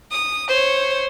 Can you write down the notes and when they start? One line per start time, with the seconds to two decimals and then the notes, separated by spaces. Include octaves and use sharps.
0.11 D#6
0.49 C5 C#5